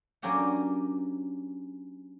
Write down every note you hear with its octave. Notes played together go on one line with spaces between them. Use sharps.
F#3 A#3 C#4 D4 G4 F#5